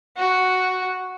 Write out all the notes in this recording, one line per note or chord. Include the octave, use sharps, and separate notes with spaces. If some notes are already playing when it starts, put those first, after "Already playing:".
F#4